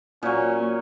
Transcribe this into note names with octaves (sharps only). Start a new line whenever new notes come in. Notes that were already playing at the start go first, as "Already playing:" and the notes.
A#2 F#3 A#3 C#4